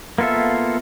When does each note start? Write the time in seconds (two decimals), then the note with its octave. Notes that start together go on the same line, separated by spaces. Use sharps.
0.18 A#3 B3 F4 A4 E5